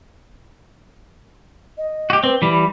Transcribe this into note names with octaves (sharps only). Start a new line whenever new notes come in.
D#5
F#4 G4
C4 B4
E3 G3 B5